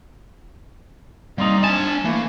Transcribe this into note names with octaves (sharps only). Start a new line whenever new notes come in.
G3 A#3 C4 D#4
D4 G#5 A5
E3 A3 A#3